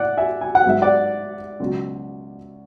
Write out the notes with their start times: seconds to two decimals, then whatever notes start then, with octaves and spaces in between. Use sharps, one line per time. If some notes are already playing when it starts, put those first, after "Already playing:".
Already playing: A2 D5 F#5
0.17 E5 G#5
0.41 G#5
0.55 F#5
0.64 G#2 F#3 B3 E5
0.82 D5 F#5
1.60 C#2 B2 F#3